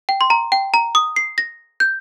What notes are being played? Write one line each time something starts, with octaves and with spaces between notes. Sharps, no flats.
G5
C6
A#5
G5
A#5
D#6
C7
A#6
G6